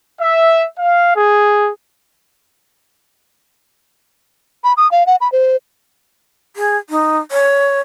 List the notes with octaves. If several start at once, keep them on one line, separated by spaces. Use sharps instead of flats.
E5
F5
G#4
B5
D#6
F5
F#5
B5
C5
G#4
D#4
C#5